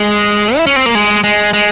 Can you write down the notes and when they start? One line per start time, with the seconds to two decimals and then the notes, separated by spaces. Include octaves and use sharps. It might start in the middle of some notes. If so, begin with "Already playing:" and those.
Already playing: G#3
0.57 E4
0.67 C#4
0.76 C4
0.86 A#3
0.95 G#3
1.24 G#3
1.53 G#3